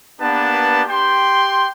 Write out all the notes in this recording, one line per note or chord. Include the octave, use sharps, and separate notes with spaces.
A#3 B3 D4 G4 B4 A5
G4 G5 C6